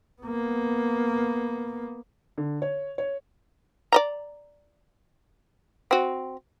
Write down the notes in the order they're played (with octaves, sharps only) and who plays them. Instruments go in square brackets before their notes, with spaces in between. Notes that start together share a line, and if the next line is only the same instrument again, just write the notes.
[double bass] A#3 B3
[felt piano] D3
C#5
C#5
[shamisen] D5 D#5 A#5
C4 F#4